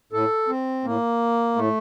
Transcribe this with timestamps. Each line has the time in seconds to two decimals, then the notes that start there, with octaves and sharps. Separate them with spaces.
0.12 A2 A4
0.48 C4
0.84 A2 A#3
1.56 A2 A3